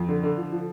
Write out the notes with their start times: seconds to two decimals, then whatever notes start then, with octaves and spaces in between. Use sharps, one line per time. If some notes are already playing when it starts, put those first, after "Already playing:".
Already playing: F2
0.09 D3
0.23 D3
0.37 F3
0.52 F3